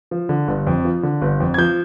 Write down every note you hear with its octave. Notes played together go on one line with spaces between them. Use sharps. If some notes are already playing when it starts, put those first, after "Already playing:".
F3
D3
G1
F2
F3
D3
G1
F2
G#6
F3 G6